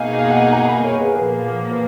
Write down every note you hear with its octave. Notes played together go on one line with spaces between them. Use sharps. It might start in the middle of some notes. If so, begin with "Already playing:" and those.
Already playing: B2 A#3 D#4 G#4 F5 G#5
F5
F#5
G#5
F#5 A#5
A#5
G#5 B5
A#4 C#5
G#4 B4
A#4
A#2 F3 A#3 G#4 B4
B4